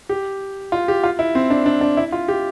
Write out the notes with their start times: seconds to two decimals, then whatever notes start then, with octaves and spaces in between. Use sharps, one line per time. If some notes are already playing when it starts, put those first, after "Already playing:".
0.09 G4
0.72 F4
0.88 G4
1.03 F4
1.19 E4
1.35 C4
1.50 D4
1.66 D4
1.81 D4
1.97 E4
2.12 F4
2.28 G4